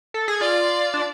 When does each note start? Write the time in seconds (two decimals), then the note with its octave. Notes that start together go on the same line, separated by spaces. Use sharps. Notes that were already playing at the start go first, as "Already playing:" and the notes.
0.14 A4
0.28 G#4
0.40 F4 D5
0.94 D4